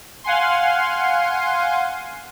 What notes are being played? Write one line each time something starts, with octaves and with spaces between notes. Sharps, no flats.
F5 F#5 G#5 C6